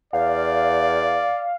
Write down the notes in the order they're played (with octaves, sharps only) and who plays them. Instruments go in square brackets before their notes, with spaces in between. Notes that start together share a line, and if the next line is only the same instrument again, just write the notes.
[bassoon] E2 [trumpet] D5 [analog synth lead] F5